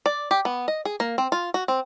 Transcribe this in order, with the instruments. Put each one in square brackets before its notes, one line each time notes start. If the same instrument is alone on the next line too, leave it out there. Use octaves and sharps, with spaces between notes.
[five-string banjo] D5
G4
B3
D#5
G#4
A#3
C4
F4
F#4
C4